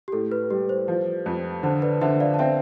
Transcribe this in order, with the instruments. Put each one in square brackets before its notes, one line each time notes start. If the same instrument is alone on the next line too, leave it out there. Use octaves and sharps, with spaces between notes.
[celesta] G4
[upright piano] A2 [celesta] A4
[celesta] B4
[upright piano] G3 [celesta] G4
[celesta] C5
[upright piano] F3
F2
[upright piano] D3 [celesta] C5
[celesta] B4 D5
[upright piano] D3 [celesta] C5 E5
[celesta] D5 F5
A5
[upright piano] C4 [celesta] E5 G5